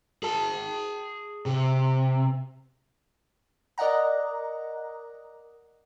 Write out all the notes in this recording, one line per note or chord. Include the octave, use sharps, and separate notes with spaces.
G#4 A5
C3
A#4 D5 D#5 F#5 A#5